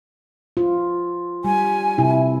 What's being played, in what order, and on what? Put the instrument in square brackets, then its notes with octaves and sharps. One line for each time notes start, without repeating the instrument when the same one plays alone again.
[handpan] F4
[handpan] G3 [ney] G#5
[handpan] C3 E4